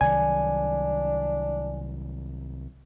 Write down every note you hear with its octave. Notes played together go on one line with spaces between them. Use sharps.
C2 D#3 F#3 D4 G#5